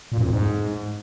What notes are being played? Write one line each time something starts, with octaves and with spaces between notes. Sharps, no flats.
A#2
F#2
F2
G#2